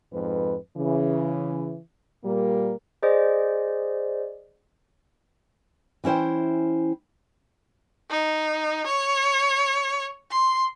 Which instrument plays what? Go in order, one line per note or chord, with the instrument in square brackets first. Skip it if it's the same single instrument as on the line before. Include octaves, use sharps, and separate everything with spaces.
[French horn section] F2 G#2 B4
C#3 E3
A#2 G3 A#3
[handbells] G#4 C5 D5 D#5
[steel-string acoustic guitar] E3 C#4 E4 C5 G5
[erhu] D#4
C#5
C6